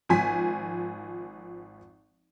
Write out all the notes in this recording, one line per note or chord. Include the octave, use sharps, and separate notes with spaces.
G#1 F3 G#5 B6